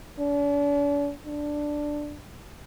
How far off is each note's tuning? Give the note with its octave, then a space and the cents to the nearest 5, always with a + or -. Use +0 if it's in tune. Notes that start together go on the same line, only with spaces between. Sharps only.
D4 -45
D4 +5